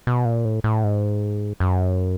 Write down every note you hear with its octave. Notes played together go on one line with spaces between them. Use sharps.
B2
A#2
A2
A2
G#2
F#2